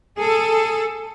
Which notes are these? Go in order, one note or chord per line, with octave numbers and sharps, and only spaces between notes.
G#4 A4